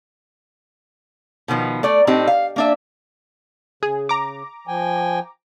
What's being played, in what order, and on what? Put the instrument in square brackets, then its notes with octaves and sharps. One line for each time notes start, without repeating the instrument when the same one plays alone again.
[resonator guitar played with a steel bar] B2 D#3 F3 B3
A3 D5
A2 C4 D4 D#4 G4
F5
A#3 D4 E5
[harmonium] C#3 [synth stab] G#4
[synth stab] A#5 D6
[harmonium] F3 G5 G#5